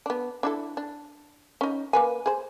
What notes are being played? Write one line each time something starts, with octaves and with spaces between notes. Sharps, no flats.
B3 D4
D4 E4 A4
D4
C#4 D#4
A#3 B4 G#5
G#4 C5